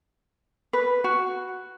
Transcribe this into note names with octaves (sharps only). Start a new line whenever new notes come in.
B4
F#4